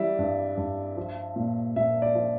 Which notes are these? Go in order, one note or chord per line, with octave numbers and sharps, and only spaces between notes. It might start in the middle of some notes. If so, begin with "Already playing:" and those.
Already playing: E3 G3 D5 E5
G2
G2
F3
A#2
A#2 E5
D5
F3